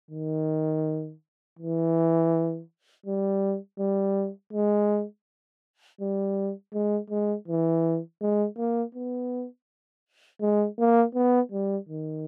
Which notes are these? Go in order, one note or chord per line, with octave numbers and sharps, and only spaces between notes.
D#3
E3
G3
G3
G#3
G3
G#3
G#3
E3
G#3
A#3
B3
G#3
A#3
B3
G3
D#3